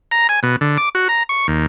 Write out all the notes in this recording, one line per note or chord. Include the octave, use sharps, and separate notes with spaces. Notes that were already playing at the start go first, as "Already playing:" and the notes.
A#5
G#5
B2
D3
D6
F#4
A#5
C#6
D#2